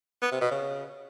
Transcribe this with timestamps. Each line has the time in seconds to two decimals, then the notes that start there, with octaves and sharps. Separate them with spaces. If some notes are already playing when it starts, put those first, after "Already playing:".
0.22 B3
0.32 C3
0.41 B2
0.51 C#3